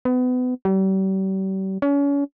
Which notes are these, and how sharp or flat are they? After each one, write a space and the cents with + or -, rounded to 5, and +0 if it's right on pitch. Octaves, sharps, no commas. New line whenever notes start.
B3 +30
G3 -40
C#4 +35